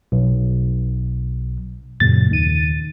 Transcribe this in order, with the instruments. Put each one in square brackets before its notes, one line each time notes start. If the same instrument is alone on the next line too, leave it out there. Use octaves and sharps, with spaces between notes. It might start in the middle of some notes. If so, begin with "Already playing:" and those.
[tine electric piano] B1
[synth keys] F#2 A#2 C#3 [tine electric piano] A6
[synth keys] D#2 D#3 D#7